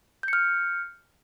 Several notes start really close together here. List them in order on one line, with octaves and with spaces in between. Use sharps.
G6 C#7 F6